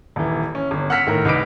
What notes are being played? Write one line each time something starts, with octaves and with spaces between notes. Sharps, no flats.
D#1 E3
C#4
G1
F#5 E6 F6 B6 C#7
A2 D#3 A#4
C2 D#4 B4 D6 B6 D7